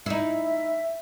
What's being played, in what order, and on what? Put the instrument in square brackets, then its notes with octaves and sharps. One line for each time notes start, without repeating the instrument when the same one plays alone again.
[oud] D#4 E4 [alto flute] E5